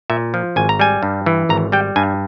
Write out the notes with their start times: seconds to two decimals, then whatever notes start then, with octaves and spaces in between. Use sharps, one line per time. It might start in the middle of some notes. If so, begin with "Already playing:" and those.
0.10 A#2 E5
0.34 F3
0.56 G#1 G#5
0.69 A#5
0.80 G3 G#5
1.03 G2
1.26 E3
1.49 G#1 A#5
1.72 G3 G5
1.96 G2 G#5